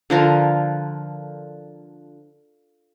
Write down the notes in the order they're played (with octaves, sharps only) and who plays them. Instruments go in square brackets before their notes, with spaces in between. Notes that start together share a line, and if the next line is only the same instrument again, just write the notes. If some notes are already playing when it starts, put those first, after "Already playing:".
[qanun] D3 F3 A#4